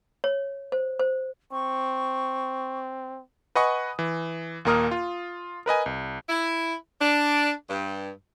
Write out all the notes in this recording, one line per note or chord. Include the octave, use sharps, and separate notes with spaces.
C#5
C5
C5
C4 C#6
B4 D#5 F#5 G#5 C#6 D#6
E3
D#2 A#2 A#3 A#4 D#6 F6
F4
A#4 B4 D#5 G#5
C2
E4
D4
G2